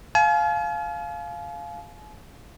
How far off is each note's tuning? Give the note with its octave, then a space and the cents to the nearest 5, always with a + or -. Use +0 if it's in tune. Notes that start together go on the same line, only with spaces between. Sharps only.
F5 +0 G#5 +45